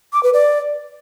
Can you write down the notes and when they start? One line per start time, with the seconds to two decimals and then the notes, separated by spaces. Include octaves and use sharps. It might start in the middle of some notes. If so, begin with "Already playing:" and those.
0.13 D6
0.23 B4
0.33 D5